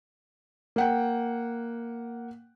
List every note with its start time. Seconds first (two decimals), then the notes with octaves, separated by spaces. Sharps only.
0.76 A#3 F#5 G5